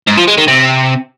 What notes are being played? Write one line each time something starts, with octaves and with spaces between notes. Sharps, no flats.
G#2
F3
G#3
D#3
C3